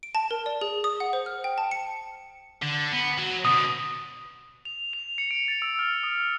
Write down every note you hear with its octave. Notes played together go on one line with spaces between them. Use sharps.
D7
A5
A#4
D5
G#4
D#6
F#5
C5
F6
G5
A5
C#7
D3
B3
F#3
B2 D3 D#6
F7
F7
C#7
D7
A6
E6
F6
D#6